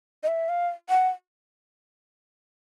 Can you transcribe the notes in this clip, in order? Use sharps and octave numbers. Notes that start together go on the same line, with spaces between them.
D#5
E5
F5
F#5